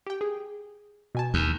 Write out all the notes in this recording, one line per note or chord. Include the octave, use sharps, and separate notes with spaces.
G4 G5
G#4
B2 G#5 A5
D#2